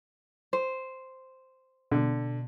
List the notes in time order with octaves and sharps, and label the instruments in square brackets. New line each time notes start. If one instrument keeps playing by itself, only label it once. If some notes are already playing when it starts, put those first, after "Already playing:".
[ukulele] C5
[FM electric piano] B2 [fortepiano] D3